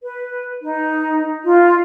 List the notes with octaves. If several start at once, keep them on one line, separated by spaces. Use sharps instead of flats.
B4
D#4
F4